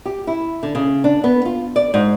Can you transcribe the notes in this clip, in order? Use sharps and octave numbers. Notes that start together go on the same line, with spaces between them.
G4
E4
D3
C#3
D4
B3
F4
D5
G#2